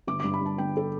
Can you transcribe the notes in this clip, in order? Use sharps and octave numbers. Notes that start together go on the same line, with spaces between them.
G1 D6
D6
G2
B5
G2 A5
G1 G5
A4